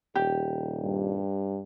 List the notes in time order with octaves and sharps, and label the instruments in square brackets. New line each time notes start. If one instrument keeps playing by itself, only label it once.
[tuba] D#1 [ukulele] G4
[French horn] G2